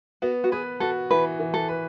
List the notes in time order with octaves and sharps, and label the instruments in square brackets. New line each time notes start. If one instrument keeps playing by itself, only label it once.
[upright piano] B3 [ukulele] F#4
[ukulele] F#4
[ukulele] G#4 [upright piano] B4
[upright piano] F#4 [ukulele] A4
[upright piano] E3 [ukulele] B4
[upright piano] E3
[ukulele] A4
[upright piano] B4